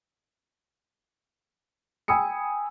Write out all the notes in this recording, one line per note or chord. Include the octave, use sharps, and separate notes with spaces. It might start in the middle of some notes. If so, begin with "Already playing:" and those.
G5 G#5 B5 D#6 E6 C#7